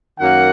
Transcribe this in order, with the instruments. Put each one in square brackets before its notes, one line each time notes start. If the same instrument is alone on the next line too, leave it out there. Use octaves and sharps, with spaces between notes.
[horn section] F#2 D#3 F#3 A#3 F#5